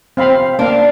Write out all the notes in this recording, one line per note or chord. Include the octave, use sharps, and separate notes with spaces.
C4 F5 B5
A#3 D4 F5